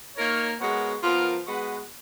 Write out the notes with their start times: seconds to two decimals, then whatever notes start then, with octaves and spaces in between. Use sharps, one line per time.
0.16 A#3 D#4 A#4 C#5
0.59 G#3 B3 F#4 A#4 C#5
1.02 F3 B3 F4 A#4
1.44 G#3 B3 F#4 B4